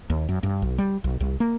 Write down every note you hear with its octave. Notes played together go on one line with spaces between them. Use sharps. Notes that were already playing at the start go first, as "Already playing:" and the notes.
D#2
F#2
G2
B1
G3
B1
C2
A#3